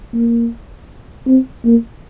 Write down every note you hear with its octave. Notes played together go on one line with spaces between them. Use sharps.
A#3
C4
A#3